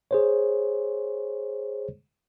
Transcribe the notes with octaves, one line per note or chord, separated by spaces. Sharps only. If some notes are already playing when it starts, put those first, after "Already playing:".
G#4 C5 C#5